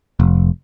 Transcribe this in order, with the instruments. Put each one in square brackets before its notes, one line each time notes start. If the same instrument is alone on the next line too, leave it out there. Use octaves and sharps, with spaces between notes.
[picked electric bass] F1